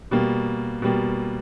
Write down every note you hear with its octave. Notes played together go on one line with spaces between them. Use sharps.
B2 G3 A#3
B2 G3 A#3